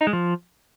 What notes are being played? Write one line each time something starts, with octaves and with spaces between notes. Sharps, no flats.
D#4
G#3
F3